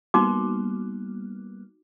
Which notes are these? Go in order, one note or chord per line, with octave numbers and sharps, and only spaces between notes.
G3 A#3 B3 D#4 F#4 D6